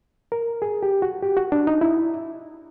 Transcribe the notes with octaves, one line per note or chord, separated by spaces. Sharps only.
A#4
G#4
G4
F#4
G4
F#4
D4
D#4
E4